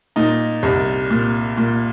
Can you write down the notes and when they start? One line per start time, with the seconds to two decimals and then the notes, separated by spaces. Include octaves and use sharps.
0.16 A#2 D#4
0.63 C2
1.10 A#2
1.57 A#2